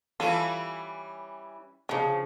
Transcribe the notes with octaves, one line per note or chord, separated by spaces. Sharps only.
E3 G3 C#4 F4 A4
C#3 F3 D4